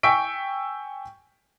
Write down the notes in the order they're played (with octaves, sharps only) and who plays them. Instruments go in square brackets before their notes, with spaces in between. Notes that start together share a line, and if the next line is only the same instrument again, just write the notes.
[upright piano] G5 G#5 C#6 E6 B6 D7